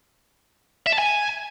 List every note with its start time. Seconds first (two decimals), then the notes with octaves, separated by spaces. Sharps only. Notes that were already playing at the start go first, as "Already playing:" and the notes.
0.86 E5
0.92 A5
0.98 G#5